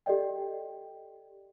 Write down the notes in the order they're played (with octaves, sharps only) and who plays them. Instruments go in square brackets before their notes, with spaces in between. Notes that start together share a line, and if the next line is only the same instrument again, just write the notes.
[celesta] G4 A4 D5 D#5 G5